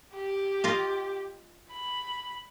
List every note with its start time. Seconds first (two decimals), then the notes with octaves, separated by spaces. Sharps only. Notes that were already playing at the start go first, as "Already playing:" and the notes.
0.15 G4
0.64 F4 D#5 F5
1.71 B5